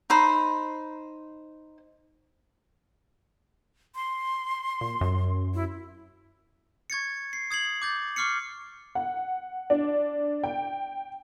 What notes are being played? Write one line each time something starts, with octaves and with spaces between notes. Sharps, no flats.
D#4 C5 B5
C6
A#2
F#2
E4
C#6 G#6 A6 C#7
C7
D#6 G#6 C7 F#7
D6 G6 A6
C#6 D6 F6 C7 C#7
F#5
D4
G5